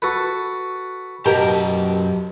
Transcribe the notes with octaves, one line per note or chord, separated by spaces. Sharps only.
F#4 A4 B4
F#2 B2 G4 A#4 A5